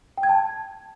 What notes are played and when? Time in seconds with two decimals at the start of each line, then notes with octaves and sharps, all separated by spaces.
0.18 G5
0.23 G#6
0.29 A5